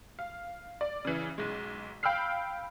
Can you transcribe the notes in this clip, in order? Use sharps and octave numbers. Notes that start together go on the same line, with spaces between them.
F5
D5
C#3 E3
B1 G#3
F5 G5 B5 E6 F6 C7